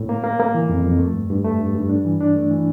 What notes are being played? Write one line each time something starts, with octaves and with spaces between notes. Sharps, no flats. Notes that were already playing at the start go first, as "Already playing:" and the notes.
Already playing: A2
A#3
A#3
A#3
E3
F2
F2
A3
G2
G2
A3
G2
G2
D4
E3
D4
A3
E3